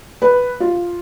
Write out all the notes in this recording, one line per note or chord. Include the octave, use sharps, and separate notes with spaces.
B4
F4